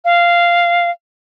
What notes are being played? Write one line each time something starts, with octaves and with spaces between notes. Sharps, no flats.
F5